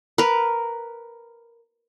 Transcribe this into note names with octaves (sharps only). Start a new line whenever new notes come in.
A#4 B4